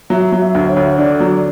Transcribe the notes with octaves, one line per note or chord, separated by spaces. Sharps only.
F#3 E5
F#3
E5
D2
C#5
D2
D3 D5
F#3